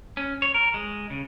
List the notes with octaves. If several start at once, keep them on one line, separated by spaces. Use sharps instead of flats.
C#4
C#5
A#4
G#3
C#3